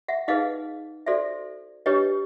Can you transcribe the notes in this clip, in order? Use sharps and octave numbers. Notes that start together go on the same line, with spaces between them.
E5 F#5
D#4 G#4 B4 D#5 F5
F#4 A4 C5 D5 E5
D4 G4 B4 C#5 D#5